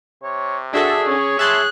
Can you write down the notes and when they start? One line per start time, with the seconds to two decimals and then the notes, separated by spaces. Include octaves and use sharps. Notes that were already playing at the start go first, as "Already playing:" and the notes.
0.23 C3 C#5
0.74 D4 F#4 G#4 A4 E5
1.08 C#4 C#5
1.39 G#4 E5 A5 C6 F#6